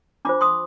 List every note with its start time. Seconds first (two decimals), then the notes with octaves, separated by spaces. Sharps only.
0.25 D4 F4 C5 B5 D6
0.41 C6 D#6